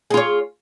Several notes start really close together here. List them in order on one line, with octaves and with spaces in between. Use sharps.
G#4 F4 C#5